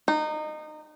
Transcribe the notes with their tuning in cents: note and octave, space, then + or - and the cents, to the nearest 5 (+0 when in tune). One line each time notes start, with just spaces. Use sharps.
D#4 -25